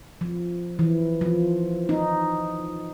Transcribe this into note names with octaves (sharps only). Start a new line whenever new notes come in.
F3
E3
F3
D#4